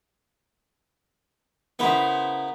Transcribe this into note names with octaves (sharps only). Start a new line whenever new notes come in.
C#3 B3 E4 A#4 C5